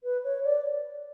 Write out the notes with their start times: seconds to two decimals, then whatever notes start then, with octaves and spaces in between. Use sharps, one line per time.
0.03 B4
0.24 C#5
0.44 D5